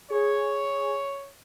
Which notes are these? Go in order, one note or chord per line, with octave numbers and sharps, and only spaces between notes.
G#4 C#5